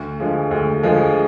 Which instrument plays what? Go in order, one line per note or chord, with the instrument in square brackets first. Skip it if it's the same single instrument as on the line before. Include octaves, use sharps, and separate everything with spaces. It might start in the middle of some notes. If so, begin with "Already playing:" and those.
Already playing: [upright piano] D2
D3 F3 G#3
D2
D3 F3 G#3